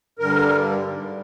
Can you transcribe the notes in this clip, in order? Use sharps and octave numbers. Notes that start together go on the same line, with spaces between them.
G2 D3 G3 A#4
G#2 G3